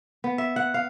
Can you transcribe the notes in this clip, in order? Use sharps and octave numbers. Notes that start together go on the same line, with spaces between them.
B3
E5
F#5
F5